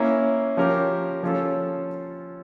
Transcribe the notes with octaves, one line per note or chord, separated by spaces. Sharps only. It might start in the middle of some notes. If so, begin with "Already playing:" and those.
Already playing: A#3 C#4 E4
F3 C#4 G4 A#4
F3 C#4 F4 A4